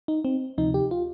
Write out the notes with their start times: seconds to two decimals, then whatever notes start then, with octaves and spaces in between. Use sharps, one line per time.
0.08 D#4
0.25 C4
0.58 D2 C3 F3 D#4
0.74 G4
0.91 F4